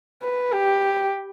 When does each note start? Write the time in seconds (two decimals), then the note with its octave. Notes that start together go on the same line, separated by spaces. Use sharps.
0.22 B4
0.53 G4